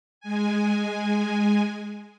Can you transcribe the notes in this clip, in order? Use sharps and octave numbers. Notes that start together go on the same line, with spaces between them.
G#3 G#5